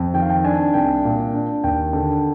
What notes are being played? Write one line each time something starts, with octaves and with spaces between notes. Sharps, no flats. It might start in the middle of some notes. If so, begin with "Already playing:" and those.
Already playing: F2
D#3 G5
F5
G5
D4 G#5
C2 G5
A#2
D4
D#2 G5
D3